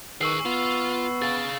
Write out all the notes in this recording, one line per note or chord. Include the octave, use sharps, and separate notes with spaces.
D#3 G#4 B4 C#6 E6 C7
B3 F4
G#4 F5 A6